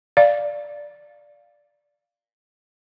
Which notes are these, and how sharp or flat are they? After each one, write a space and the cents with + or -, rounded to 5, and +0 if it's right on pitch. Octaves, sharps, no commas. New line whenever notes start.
D5 +0 F5 +0